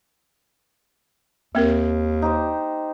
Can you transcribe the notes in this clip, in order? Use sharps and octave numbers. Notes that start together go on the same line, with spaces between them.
D#2 A#3 C4 A#4
D#4 G4 C5